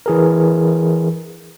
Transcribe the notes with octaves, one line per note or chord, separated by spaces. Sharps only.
E3 G#4 A#4